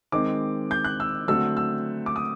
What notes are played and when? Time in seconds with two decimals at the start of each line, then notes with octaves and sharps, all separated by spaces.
0.12 D#3 G#3 C4 D6
0.71 G6
0.84 F#6
1.00 E6
1.28 D3 F#3 A3 C4 E6
1.57 E6
2.06 D6
2.16 D#6